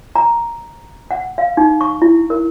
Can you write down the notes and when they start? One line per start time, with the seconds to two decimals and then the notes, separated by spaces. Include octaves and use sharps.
0.15 A#5
1.11 F#5
1.38 F5
1.57 D#4
1.81 C#6
2.02 E4
2.30 A#4